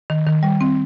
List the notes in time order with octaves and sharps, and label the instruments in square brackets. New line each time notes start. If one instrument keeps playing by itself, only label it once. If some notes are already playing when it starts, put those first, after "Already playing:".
[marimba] D#3
D#3
G3
C4